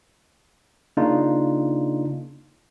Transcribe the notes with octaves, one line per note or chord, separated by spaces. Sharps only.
C#3 A#3 D4 D#4 F4